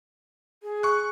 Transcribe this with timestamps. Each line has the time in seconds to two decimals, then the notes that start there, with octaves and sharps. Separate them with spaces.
0.62 G#4
0.83 C#6 F#6